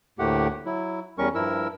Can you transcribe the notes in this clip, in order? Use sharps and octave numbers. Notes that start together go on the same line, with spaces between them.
D2 A2 A3 A#3 G4 F#5
F#3 E4
E2 G3 C#4 A#4 C#6
G2 F3 E4 A#4 E6